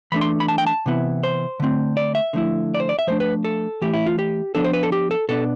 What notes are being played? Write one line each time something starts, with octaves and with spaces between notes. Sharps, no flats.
E3 A3 D4 B5
C6
B5
A5
G5
A5
C3 E3 B3 E4
C5
D3 A3 C4
D5
E5
D3 F3 A3 E4
D5
C5
D5
E5
F3 A3 D4 C5
B4
A4
E3 A3 E4 G4
E4
F4
G4
F3 B3 D4 A4
C5
B4
A4
G4
A4
B2 B3 D4 A4